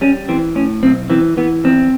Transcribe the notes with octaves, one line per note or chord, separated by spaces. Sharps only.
G3 C#4
E3 C4
A2 C#4
B1 C4
E3 C4
E3 B3
E2 C4